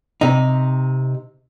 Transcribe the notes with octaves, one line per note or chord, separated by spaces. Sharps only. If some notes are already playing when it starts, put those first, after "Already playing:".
C3 D#4